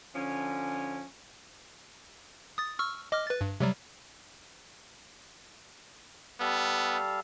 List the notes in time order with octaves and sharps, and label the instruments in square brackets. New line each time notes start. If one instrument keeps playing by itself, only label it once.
[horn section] D3 F3 C#4
[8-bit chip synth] D#6 A6
C#6 E6 F6
D#5 D6 F6
B4 A6
G2
C3 F#3 G3
[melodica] G3 A4 F5 [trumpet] B3